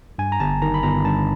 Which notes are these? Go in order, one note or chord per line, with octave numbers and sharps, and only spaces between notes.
G2 G#5
A#5
G1 A5
D#3 A#5
B5
G1 A#5
G2 A5